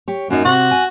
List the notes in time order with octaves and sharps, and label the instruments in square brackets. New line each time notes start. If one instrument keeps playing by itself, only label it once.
[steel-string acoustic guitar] G4 C#5
[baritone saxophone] F#2 [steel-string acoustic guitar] A#3 D#4
[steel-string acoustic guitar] C3 [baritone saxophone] F#4
[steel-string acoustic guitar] G#5